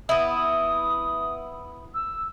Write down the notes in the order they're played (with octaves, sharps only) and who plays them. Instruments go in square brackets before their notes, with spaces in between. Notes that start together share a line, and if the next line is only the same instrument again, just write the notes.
[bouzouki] B3 E4 [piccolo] D#6
[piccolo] E6